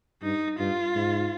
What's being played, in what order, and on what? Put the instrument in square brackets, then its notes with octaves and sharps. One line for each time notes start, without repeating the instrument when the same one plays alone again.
[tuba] G2 [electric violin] D#4
[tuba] G2 [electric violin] F4
[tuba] G#2